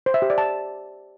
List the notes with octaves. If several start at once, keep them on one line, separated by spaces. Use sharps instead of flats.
C5
E5
G4
D5
A5